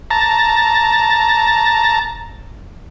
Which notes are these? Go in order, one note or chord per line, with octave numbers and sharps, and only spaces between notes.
A5 A#5